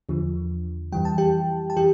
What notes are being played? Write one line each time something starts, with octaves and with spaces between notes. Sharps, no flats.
E2 D3 F3
F2 E3 G3 G5
A5
G4 G5
A5
E3 G4 G5